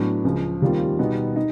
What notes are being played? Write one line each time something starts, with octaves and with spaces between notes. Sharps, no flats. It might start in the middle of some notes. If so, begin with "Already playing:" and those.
Already playing: A2 F#3 B3 D4
C#2 C#3 F3
D#2 D#3 G3 C4 F4
B2 G3 B3 D#4
D#4